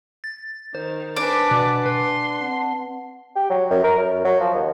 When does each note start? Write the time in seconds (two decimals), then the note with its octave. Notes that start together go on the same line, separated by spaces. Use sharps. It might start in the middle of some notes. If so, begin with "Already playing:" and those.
0.24 A6
0.75 D#3 C5
1.16 D4 B4 D5 G#5 D6
1.51 B2 F#5 G#5 A5
1.86 B4 C6
2.40 C4 F#5 A5
3.36 G4
3.50 F#3
3.70 F#2
3.84 A#4
3.97 F#2
4.24 F#3
4.40 F3
4.54 D#2